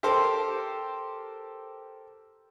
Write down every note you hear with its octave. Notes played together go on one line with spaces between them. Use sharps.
G4 A4 A#4 C5